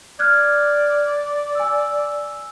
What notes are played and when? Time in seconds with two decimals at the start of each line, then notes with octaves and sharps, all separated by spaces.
0.19 D5 F6 F#6 G#6
1.55 G#5 E6